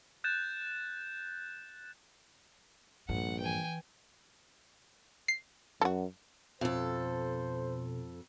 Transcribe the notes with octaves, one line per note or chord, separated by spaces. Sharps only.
F#6 G6 A6 E7
A#1 G2 B3 F#5
E3 G5 G#5
C7
F#2 F#4 A4
F2 B2 A4 C5